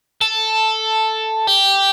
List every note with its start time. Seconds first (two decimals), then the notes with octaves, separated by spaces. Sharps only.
0.21 A4
1.47 G4